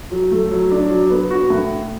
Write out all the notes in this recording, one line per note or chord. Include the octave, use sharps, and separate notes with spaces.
F#3
A3
F#3
D4
F#3
B3
F#4
A2